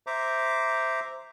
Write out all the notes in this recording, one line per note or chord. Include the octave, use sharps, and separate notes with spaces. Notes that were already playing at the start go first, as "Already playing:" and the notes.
C5 E5 A#5 D6